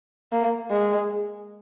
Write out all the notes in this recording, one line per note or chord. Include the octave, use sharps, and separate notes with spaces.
A#3
G#3